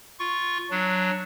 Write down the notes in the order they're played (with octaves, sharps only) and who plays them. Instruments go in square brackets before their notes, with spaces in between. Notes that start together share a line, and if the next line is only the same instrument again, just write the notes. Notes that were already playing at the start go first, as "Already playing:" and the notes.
[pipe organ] F4 C#6
F#3 D4